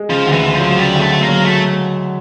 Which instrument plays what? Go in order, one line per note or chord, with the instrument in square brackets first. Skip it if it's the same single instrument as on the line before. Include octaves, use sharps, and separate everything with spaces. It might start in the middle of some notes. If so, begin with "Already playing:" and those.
Already playing: [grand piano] G#3
[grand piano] C#3 [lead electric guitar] F3
[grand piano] D2
[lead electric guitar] E3
[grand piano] D2
[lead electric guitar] F3
[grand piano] F#3
[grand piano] C#3 [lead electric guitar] G3
[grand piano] D2
[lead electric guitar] A3
[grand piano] D2
[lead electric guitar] A#3
[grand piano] F#3
[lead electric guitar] A3